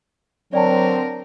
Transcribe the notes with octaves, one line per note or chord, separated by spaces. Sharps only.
D3 F#3 C4 A#4 D5 G5 A5